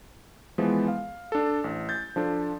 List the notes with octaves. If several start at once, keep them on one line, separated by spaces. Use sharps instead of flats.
E3 F3 G#3 B3
F5
D4 A4
A1
G6 A6
F3 D4 A4